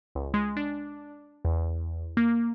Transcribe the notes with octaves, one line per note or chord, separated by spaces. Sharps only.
C#2
G#3
D4
E2
A#3